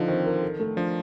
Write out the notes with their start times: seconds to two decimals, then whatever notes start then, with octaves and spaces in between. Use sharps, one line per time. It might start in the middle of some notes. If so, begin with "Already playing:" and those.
Already playing: D3 F3 D#4
0.08 D#3 C4
0.26 A#4
0.43 A4
0.59 A3
0.76 F3 D4